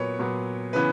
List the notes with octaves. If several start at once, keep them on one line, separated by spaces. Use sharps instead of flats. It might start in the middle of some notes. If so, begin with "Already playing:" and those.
Already playing: A#2 F#3 B3 B4 C#5
A#2 F#3 B3
C#3 E3 B3 B4